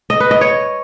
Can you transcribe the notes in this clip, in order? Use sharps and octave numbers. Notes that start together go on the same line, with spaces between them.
D#5
B4
D#5
C#5